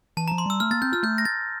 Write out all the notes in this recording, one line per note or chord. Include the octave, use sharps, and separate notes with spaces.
E3 A5
F3 A#5
C6
G3 E6
A3 F6
A#3 A6
C4 G6
F4 F6
A3 G6
A#6
A6